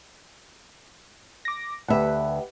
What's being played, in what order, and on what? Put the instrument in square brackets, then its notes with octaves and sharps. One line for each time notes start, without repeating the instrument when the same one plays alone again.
[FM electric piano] D6 A#6
[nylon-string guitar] D2 E5 [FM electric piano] G4 B4 F#5